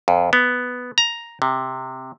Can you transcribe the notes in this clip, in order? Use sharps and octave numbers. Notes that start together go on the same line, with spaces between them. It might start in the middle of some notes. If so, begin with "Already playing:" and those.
F2
B3
A#5
C3